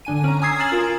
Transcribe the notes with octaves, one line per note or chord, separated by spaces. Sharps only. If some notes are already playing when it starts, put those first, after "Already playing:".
D3 D4 G#5 D#7
C#4 A#5
G#5 A#5 D#6 E6 G#6 C7
F6 G#6 A6 C7 E7 F#7
F4 A#4
A#5